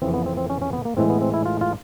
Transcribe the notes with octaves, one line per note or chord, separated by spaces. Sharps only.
F2 C#3 E3 C4
B3
C4
C4
C#4
C#4
B3
A#3
A2 E3 G#3 C4
B3
C4
E4
F4
F4